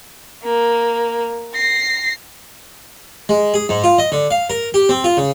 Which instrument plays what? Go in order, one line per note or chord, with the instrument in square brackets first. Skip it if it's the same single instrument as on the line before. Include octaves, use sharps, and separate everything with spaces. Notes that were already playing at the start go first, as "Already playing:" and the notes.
[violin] A#3
A#6 C7
[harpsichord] G#3
G#4
G#2
F4
D#5
D3
F5
A#4
G4
C4
F4
C#3